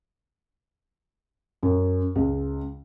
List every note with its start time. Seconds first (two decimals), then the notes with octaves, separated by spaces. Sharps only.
1.63 F#2
2.15 C#2